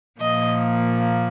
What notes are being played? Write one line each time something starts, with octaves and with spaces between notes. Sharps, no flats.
A#2 F3 A#3 D#5